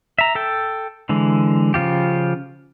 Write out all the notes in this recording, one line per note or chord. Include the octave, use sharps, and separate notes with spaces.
E5 A#5
A4 G5
D3 E3 G#3
C#3 F3 F4 G4